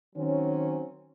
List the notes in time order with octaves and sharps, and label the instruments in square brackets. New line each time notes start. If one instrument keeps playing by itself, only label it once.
[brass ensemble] D#3 F#3 C4 C#4